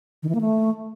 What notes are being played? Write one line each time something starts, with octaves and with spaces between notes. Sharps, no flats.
D#3
E3
A#3
A3